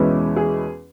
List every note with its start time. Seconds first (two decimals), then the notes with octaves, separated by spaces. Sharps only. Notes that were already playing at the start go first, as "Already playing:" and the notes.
Already playing: E2 B2 G#3 C#4 E4
0.36 G#4